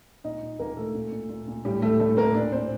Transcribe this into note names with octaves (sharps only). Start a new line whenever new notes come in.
A#2 D#4 D#5
A#2
A#2 A#3 A#4
A#2 A3 A4
A#2
A#2
A#2
A#2
A2 G3 G4
A2 A3 A4
A2 A3 A4
A2 A#3 A#4
A#2 D4 D5
A#2 C4 C5